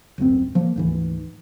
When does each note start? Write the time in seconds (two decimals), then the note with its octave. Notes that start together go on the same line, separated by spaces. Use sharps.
0.18 D1 G#1 F#2 C4
0.55 F3 A#3
0.76 D2 G#2 E3